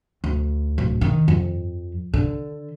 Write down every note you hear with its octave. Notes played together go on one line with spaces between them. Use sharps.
D2
D1
D#3
F2
D3